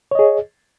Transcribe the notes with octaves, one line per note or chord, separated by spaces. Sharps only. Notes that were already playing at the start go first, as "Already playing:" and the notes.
G#4 C#5 D#5